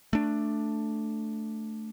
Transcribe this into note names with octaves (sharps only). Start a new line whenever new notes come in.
A3 D4